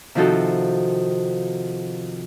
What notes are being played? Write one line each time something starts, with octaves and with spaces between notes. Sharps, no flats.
C3 D#3 F3 D#4 F#4 A4